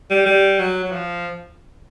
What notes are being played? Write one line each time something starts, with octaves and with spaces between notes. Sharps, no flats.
G3
G3
F#3
F#3
F3